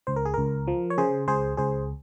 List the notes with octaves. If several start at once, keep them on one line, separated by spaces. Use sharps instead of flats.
C#2 C5
A#4
G#4
C#2 A#4
F3
C#5
C#3 G#4 C5
C#2 G#4 C5
C#2 G#4 C5